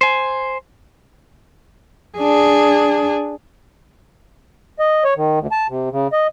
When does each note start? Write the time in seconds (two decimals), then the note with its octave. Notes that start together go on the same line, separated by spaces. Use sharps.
0.01 C5 G#5
2.19 D4 G#4
4.79 D#5
5.04 C#5
5.17 D#3
5.40 D2
5.52 A5
5.69 C3
5.92 C#3
6.13 D#5